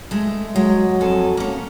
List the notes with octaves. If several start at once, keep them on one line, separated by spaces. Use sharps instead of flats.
G#3 A3
F#3 G#3
F2 A4 G#5
A#3 C#4